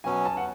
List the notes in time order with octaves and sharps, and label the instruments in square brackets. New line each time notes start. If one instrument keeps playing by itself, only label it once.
[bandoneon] B2 F#3 C#4 [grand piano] G#5
[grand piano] A5
F#5